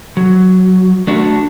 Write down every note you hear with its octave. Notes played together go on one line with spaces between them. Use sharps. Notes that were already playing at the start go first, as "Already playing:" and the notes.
F#3
A3 D4 F#4